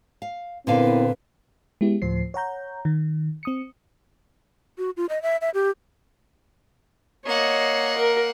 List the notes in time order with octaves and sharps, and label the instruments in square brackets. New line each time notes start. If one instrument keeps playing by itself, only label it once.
[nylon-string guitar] F5
[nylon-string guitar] A#2 D3 F5 [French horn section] B3 E4 A#4 [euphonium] C4 [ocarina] B4
[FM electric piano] G#3 B3 E4 G4
D2 A2 F3 C5 C7
C#5 F#5 A#5 G6
D#3
C4 D#6 C#7
[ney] F#4
F4
D#5
E5
E5
G4
[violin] A#3 F#5 [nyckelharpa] C#5 D#5
[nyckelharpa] A#4